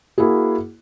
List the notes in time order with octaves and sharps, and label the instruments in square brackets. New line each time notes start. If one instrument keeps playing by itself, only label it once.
[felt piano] A#3 E4 F#4 G#4